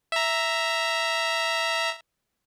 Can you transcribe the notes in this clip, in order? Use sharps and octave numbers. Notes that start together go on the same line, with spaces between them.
E5 A#5